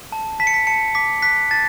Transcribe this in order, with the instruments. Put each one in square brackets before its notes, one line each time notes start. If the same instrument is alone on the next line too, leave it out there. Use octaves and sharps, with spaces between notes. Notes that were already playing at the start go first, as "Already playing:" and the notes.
[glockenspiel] A5
A5 B6
C#7
B6
A5 C#7
D6 B6
F#6 B6
A5 A6